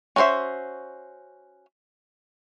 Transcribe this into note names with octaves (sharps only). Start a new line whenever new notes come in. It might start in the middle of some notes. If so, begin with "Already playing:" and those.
C#4 F#4 A#4 C5 E5